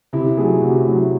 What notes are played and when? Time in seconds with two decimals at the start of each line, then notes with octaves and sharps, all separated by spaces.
0.13 C3 E4
0.37 F#3 A3 G#4
0.62 C3 F#4
0.87 F#3 A3 E4